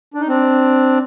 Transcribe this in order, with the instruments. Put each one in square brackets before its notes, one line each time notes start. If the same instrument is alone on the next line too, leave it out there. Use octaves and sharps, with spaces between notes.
[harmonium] D4
D#4
C4 D4